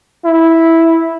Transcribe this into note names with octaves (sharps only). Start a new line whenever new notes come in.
E4